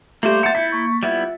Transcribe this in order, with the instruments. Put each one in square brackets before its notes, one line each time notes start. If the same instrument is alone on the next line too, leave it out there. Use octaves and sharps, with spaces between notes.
[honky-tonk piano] G3 A3 [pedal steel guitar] A#3 C5 [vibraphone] E5 [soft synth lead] D6
[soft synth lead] F#5 [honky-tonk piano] A6 C#7
[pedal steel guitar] E4 [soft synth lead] G6 [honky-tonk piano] B6
[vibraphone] A#3 C#6
[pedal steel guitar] G3 B3 E4 [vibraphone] F4 [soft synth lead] E5